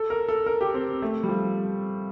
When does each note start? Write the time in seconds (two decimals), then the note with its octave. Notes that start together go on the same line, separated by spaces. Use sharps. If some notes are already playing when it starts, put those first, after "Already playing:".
Already playing: A4
0.10 A#4
0.29 A4
0.46 A#4
0.61 G4
0.74 C4
1.02 A3
1.23 G3
1.29 F3